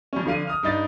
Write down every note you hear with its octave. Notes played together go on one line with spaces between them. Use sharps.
F2 C#4
F2 D3 F5 D#7
D#6 F6
G2 D#4 A6